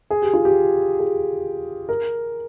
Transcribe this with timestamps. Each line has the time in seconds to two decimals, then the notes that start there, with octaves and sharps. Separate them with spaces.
0.10 G#4
0.22 G4
0.33 F4
0.45 G4
0.99 G#4
1.89 A#4